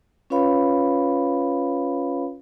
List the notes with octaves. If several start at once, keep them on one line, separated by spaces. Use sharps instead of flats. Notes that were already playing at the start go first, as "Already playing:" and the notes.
C#4 F4 B4 C#5 F5 B5